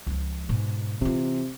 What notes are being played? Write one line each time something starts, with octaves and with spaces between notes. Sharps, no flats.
C#2 F3
G#2 B2
C3 E3 F4